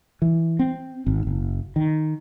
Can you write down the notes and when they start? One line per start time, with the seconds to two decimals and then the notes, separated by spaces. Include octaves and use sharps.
0.22 E3
0.59 C4
1.06 G#1
1.27 F#1
1.76 D#3